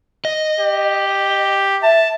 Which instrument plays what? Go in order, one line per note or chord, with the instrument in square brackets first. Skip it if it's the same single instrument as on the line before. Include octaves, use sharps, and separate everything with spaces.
[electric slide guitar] D#5
[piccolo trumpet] G4
[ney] E5 [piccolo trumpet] A5